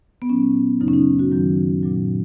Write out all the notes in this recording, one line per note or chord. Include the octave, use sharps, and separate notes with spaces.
B3
A#2 F#3 C#4
F#2 C#3 F#3 D#4
C#4
D#4
F#4
F#2 D#3 F#3
A#2 F#3